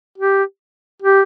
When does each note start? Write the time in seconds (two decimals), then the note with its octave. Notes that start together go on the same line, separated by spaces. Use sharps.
0.18 G4
1.02 G4